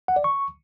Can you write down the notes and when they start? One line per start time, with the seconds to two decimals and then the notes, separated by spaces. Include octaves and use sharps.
0.08 F#5
0.16 D5
0.24 C#6